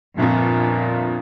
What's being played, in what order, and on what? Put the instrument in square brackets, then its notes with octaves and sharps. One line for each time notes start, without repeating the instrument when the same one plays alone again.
[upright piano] G1 F2 F3 [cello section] A#2